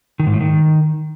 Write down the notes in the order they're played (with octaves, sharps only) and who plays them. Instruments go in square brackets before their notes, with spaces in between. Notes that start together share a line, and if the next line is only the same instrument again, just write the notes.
[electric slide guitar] D#3
G#2
A2
D#3